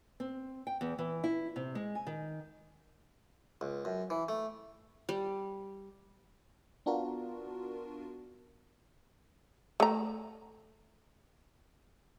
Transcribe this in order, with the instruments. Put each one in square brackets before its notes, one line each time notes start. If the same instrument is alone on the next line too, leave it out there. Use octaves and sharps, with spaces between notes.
[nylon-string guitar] C4
G5
E2
E3
E4
C3
G#3
G#5
D#3
[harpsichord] C#2
F#2
E3
A3
[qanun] G3
[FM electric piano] B3 D4 F4 F#4 A#4
[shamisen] A3 A#5